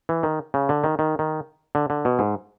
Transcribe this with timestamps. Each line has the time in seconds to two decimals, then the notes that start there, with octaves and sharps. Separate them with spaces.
0.09 E3
0.23 D#3
0.54 C#3
0.69 D3
0.84 D#3
0.99 D#3
1.19 D#3
1.75 D3
1.90 D3
2.05 B2
2.19 G#2